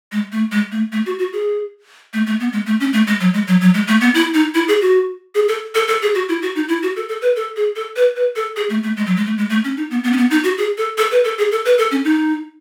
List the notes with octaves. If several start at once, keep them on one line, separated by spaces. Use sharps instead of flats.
G#3
A3
G#3
A3
A3
F#4
F#4
G#4
A3
A3
B3
G#3
A3
C#4
A3
G#3
F#3
G#3
F#3
F#3
G#3
A3
B3
E4
D#4
E4
G#4
F#4
G#4
A4
A4
A4
G#4
F#4
E4
F#4
D#4
E4
F#4
A4
A4
B4
A4
G#4
A4
B4
B4
A4
G#4
A3
A3
G#3
F#3
G#3
A3
G#3
A3
C#4
D#4
B3
B3
C#4
B3
D#4
F#4
G#4
A4
A4
B4
A4
G#4
A4
B4
A4
C#4
D#4